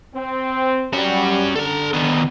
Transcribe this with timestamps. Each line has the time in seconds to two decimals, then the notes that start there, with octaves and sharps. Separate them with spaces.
0.15 C4
0.93 G3 C#4 F#4
1.55 D3 A4 A#5
1.93 D#3 B3